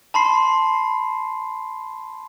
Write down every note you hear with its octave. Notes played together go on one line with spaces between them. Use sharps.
A5 B5 C6 C7